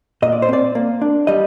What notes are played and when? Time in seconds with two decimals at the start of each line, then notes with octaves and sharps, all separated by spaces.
0.22 A#2 D#5
0.32 D5
0.42 C5
0.49 C4 D5
0.75 A#3
1.02 D4
1.27 G3 D#5